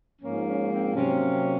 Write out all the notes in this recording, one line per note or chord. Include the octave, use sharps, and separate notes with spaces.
G#2 F3 A#3 C#4
C#4
C4
C3 F#3 A#3 C#4